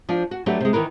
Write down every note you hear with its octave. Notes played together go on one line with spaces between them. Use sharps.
F3 D4
F#4
F#3 A3 B3 D4 G4
C3 G#3
D#3 E3 A#4 B4